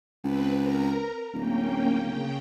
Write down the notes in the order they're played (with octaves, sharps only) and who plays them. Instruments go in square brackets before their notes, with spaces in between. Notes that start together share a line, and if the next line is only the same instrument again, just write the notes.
[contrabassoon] C#2 [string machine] C4 B4
[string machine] A#4 A#5
[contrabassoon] D1 [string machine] A#3 C#4 G5
[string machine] C#3 G5